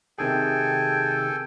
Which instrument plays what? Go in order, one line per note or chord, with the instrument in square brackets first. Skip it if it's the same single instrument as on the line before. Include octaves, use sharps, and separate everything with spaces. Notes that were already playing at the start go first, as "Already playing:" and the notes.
[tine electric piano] C3 D#3 G#4 [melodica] A4 G5 G#5